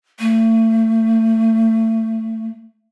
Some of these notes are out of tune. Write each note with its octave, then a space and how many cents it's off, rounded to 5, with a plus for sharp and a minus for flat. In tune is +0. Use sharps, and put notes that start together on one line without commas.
A3 +30